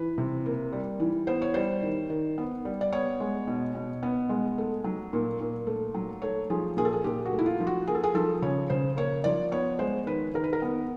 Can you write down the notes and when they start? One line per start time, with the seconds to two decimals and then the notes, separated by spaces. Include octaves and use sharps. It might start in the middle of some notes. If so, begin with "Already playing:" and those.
Already playing: E3 B4
0.18 C3
0.46 A#3
0.72 G3
1.00 E3
1.27 B3 C5
1.42 C#5
1.54 G3 C5
1.83 D#3
2.10 D#3
2.38 B3
2.65 G3
2.81 D5
2.92 B3 C#5
3.20 G#3
3.47 B2
3.75 B2
4.03 B3
4.29 G#3
4.58 A3
4.84 F#3
5.13 A#2
5.40 A#2
5.67 A3
5.94 F#3
6.22 A3 C#5
6.50 F3 G#4
6.77 A#2 G#4
6.85 A4
6.93 G#4
7.04 A#2 G4
7.25 F#4
7.33 A3
7.38 E4
7.46 F4
7.60 F3
7.67 F#4
7.87 A#3 G#4
7.95 A4
8.03 G#4
8.14 F3 A4
8.42 C#3 C#5
8.70 C#3 C5
8.97 A#3 C#5
9.24 F3 D5
9.52 B3 C#5
9.79 G#3 C5
10.07 D#3 B4
10.34 D#3 A#4
10.44 B4
10.53 A#4
10.62 B3